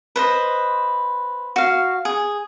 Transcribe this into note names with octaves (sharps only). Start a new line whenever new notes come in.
B4 C5 D#5
F#4 F5
G#4